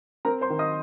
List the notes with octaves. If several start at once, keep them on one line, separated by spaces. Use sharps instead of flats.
C4 A#4 A#5
C5 C6
D#3
D#5 D#6